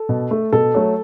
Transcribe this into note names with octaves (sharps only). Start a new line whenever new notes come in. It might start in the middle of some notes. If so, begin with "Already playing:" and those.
Already playing: A4
B2
A3
B2 A4
F#3 A3